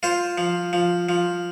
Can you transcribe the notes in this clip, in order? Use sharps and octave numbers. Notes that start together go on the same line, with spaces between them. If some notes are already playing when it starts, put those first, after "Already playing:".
F4 C5
F3
F3
F3